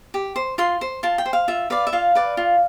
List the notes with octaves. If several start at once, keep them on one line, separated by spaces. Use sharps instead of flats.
G4
C5
F4 C6
C5
F4 A5
G5
C5
F5
F4 E5
B4 D5 F5
E5
F4 F5
B4 D5
F4